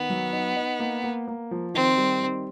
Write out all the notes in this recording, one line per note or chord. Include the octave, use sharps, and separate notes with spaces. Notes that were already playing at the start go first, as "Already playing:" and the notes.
Already playing: D#3 B3
F#3
D#4
D#4
A#3
A#3
A#3
F3
D#3 C4
G3
D#3